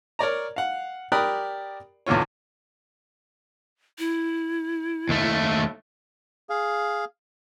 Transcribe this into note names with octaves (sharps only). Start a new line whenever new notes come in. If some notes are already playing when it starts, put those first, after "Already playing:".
A#4 C#5 D5 A#5
F5 F#5
G4 A#4 D5 B5 D#6 F#6
B1 E2 D3 F4 C#5
E4
D#2 A3
G#4 F5